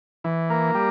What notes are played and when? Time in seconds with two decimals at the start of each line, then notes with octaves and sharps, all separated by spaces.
0.24 E3
0.50 A#3
0.75 G3